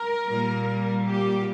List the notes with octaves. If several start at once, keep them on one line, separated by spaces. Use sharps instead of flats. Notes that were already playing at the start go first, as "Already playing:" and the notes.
Already playing: A#4
A#2 G3 A#3
G4